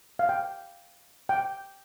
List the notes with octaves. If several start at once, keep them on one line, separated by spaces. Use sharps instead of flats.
F5
G5
G5